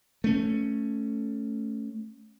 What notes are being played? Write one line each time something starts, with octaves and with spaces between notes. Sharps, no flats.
A3 C#4